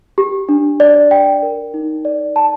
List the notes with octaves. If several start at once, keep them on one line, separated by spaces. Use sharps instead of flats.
G4
D4
D5
G5
A#4
D#4
D5
A5